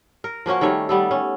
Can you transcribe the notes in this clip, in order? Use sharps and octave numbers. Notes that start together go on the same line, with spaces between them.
A#4
F3 A#3 C#4 F#4
D#3 G3 A3 C#5
G3 B3 A4
C#4